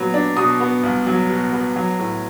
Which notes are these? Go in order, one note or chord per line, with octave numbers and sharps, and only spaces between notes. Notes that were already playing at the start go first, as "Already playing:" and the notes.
Already playing: A#2 F#3 B3
D4
B2 D#6
B3
C2
F#3
B2
B3
F#3
A2